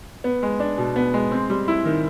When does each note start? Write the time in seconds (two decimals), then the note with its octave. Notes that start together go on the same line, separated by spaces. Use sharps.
0.24 B3
0.43 G#3
0.60 D4
0.78 B2
0.96 B3
1.14 G#3
1.32 C4
1.50 G3
1.68 E4
1.85 D#3